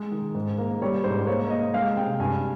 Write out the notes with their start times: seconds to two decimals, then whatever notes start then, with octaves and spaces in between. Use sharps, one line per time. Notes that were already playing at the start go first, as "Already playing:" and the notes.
Already playing: G#3
0.12 D#3
0.35 G#2
0.58 A#3
0.82 G3 C#5
1.04 G#2 C5
1.27 A#3 C#5
1.50 A#3 D#5
1.74 G#3 F5
1.96 C3 G5
2.20 G2 G#5